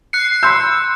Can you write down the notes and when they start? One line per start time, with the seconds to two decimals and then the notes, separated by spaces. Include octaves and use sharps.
0.13 F#6 C7 C#7
0.43 B5 C6 E6 G6